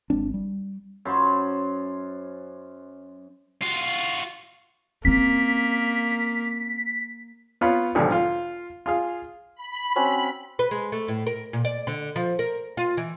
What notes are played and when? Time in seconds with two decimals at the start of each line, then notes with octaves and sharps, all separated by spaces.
0.10 G#1 G#3 C4 D4
0.34 G3
1.05 F#2 C5 B5
3.63 F4 F#4
5.05 A#3 C4 C#4 B6
7.61 B3 F4 C#5 B5
7.95 B1 G#2 D3 F3 G3
8.12 F4
8.86 F4 G#4 F5
9.55 B5
9.96 C4 C#4 F#4
10.59 B4
10.71 G#3
10.92 A3
11.08 A2
11.27 A#4
11.53 A#2
11.65 D5
11.87 D3
12.16 F3
12.39 A#4
12.77 F4
12.97 E3